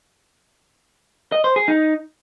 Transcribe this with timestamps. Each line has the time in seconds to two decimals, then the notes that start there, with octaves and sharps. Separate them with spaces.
1.32 D#5
1.44 C5
1.56 G#4
1.68 D#4